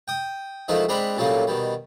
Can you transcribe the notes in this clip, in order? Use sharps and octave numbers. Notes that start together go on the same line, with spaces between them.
G5 D#6
D#3 F3 G#3 A3 D#4 E4
G#3 C4 D4 A#5 B5
A#2 C#3 F#3 G3 A3 A#3
B2 D#3 G3